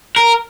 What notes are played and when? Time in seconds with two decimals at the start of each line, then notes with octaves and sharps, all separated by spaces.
0.16 A#4